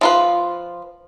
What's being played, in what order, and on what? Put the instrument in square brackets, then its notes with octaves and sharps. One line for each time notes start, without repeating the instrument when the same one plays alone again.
[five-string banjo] F3 F4 B4